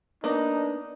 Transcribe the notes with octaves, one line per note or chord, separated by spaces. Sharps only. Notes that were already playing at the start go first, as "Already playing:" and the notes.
A#3 B3 D4 D#4